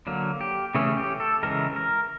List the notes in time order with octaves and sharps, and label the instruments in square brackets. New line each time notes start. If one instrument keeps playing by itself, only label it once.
[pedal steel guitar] D3 F#3 A#3
G4
C#3 E3 A3 C#4 G#4
G4
A4
C#3 E3 G#3 A#4
A#4